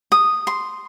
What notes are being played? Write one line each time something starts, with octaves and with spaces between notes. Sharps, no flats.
D#6
C6